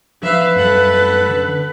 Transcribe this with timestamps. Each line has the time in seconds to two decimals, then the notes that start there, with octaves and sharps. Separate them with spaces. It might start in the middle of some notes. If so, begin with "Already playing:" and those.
0.23 F3 B4 E5 F5
0.56 F#2 G3 A3 A4 F#5
1.29 D3 C#4